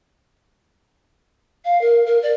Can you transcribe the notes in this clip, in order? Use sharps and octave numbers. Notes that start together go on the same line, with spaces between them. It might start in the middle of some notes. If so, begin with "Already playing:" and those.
F5
A#4
A#4
D5